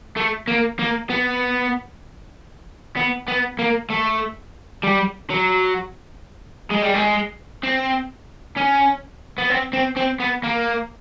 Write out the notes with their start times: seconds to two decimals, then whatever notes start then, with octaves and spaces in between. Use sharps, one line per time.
0.16 A3
0.47 A#3
0.79 A#3
1.10 B3
2.97 B3
3.28 B3
3.59 A#3
3.90 A3
4.83 G3
5.30 F#3
6.70 G#3
6.82 G3
6.94 G#3
7.64 C4
8.56 C#4
9.38 B3
9.50 C4
9.73 C4
9.97 C4
10.20 B3
10.43 A#3